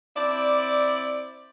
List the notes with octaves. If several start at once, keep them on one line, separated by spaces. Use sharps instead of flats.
C4 E4 D5